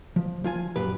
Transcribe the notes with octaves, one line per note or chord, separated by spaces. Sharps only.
F3
F3 F4 G#5
F#2 A#2 G4 B4